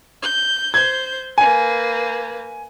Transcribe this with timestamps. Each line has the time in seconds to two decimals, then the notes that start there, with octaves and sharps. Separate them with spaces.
0.23 G6
0.74 C5 G6 G#6
1.38 A#3 B4 G#5